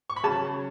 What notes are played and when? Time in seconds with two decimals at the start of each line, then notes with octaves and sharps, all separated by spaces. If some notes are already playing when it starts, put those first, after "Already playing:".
0.10 C#6
0.16 B5
0.23 C#3 F#3 C#4 A5